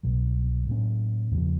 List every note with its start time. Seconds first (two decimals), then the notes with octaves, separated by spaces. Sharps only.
0.03 C2 B2 F#3
0.68 A2 F#3 A#3 C#4
1.31 E2 C#3 F3